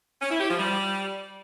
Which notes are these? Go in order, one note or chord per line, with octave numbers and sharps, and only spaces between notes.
C#4
E4
G4
F3
G3